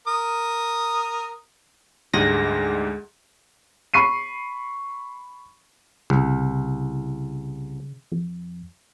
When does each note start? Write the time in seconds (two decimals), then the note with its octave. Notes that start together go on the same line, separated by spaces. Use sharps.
0.07 A#4 D#6
2.14 D2 G#2 G3 G#3 A#6
3.94 B5 C#6 C7 D#7
6.10 C2 C#3
8.12 F2